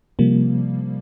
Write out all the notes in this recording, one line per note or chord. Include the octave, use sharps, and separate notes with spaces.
C3 F3 G3 A#3